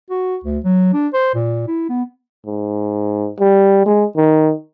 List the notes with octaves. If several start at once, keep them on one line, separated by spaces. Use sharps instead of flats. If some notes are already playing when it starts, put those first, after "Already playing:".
F#4
D2
F#3
D4
C5
A#2
E4
B3
G#2
G3
G#3
D#3